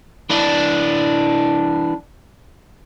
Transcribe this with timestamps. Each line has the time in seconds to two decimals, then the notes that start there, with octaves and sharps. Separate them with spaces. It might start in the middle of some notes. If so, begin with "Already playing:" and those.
0.30 E3 D4